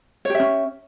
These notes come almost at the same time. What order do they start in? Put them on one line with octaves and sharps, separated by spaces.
C#5 G4 E5 C#4